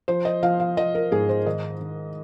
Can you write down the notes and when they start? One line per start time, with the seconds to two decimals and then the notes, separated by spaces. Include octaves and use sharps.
0.08 F3 C5
0.25 D#5
0.43 F3 F5
0.60 F5
0.77 F3 D#5
0.95 A#4
1.12 G#2 G#4
1.29 C5
1.46 D#3 D#5
1.81 D#3